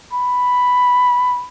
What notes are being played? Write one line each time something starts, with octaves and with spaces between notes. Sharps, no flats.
B5